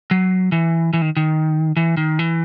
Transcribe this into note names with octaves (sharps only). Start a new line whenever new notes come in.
F#3
E3
E3
D#3
D#3
E3
D#3
E3